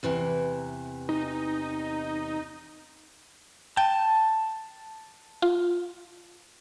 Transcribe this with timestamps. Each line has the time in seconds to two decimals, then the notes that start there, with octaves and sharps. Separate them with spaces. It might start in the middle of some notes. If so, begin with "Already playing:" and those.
0.03 E2 C3 E3
1.09 D#4
3.77 G5 A5
5.42 F4